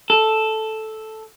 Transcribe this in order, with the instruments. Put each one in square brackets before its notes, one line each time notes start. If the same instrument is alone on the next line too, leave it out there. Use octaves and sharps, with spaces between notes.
[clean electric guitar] A4